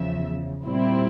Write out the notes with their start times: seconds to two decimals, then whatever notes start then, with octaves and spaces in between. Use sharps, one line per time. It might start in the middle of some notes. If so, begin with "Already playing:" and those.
Already playing: E2 C#3 F3 E5
0.65 A#2 G3 C4 E4